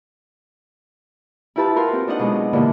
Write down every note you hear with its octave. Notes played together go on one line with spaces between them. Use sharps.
E4 F4 G4 B4 A5 B5
F4 F#4 A#4 B5 C6
C4 B4
D4 D#4 D#5 F#5
B2 F#3 G#3 B3
G2 A#2 D3 E3